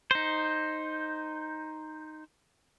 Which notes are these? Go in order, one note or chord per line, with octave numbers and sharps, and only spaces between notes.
D#4 C5